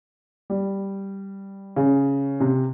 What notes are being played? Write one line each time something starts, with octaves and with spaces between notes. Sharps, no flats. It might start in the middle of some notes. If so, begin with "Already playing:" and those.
G3
C#3
C3